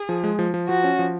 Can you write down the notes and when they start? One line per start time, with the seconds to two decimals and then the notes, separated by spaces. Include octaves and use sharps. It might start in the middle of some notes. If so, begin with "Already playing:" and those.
Already playing: G#4
0.09 F3
0.24 G#3
0.39 F3
0.54 F3
0.68 F3 F#4
0.84 C#4
0.99 F3